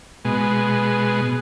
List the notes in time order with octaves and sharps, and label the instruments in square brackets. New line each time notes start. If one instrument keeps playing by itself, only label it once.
[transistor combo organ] B2 G#3